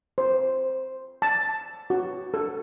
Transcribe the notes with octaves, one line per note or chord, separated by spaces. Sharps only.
C5
A5
F#4
A4